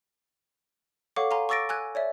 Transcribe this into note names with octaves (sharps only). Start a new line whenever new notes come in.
A4 C#5 F5 F#5 C#6 D6
F5 G#5 A#5 C6
C#6 D6 E6 A6 A#6 D7
G#5 E6 F#6 G#6
C#5 D5 E5